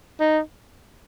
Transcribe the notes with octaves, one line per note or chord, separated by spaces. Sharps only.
D#4